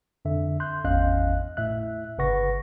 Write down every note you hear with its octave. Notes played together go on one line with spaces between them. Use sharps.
F2 D3 E5
C6 F#6 G6
G#1 E2 C#4 D#5 F5 F#6
A2 E5 F#6
G1 C#3 B4 F#5 C#6 A#6